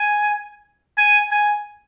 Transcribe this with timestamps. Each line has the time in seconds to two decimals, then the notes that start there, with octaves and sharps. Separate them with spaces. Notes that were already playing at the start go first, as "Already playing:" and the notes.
Already playing: G#5
0.98 G#5
1.31 G#5